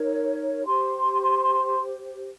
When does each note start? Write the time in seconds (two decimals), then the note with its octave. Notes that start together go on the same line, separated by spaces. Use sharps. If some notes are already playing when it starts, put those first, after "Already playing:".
Already playing: D#4 A#4 C#5
0.66 G4 C5 C6